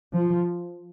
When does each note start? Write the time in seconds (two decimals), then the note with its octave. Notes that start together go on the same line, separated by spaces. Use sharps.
0.14 F3